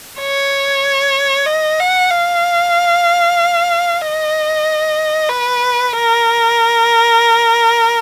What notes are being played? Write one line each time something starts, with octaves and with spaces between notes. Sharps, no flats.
C#5
D#5
F#5
F5
D#5
B4
A#4